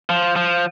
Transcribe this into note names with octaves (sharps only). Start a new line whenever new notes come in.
F3
F3